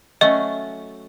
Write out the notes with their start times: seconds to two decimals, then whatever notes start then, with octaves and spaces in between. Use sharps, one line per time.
0.21 F#3 A3 C#4 D#5